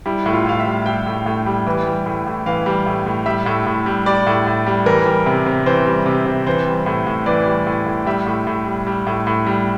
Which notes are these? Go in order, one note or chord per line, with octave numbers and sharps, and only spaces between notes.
G3 E4
A2
F4
A2 F5
E5
G3
G3 G5
A2
A2
G3
E3
G3
A2
A2
E3 F5
G3
A2
A2
G3 E5
A2
A2
G3
G3 D5
A2
A2
G3
E3 A#4
G3
C3
C3
E3 C5
G3
C3
C3
E3 C5
G3
A2
A2
E3 D5
G3
A2
A2
G3 E5
A2
A2
G3
G3
A2
A2
G3